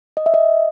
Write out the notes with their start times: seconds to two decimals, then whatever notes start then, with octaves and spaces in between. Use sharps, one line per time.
0.17 D#5
0.26 E5
0.34 D#5